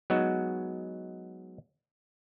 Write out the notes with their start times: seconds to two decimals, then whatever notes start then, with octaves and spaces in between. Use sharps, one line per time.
0.10 F#3 G#3 B3 D#4 F#4